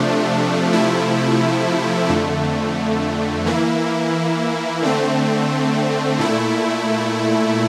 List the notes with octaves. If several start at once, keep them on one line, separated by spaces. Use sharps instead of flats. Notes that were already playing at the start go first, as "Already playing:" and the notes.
Already playing: C3 F3 A3 D4
C3 F3 A3 E4
F2 D3 A3
E3 A#3 E4
D3 A3 C4
A#2 A3 E4